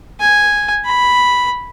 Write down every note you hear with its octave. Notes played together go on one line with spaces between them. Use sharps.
G#5
B5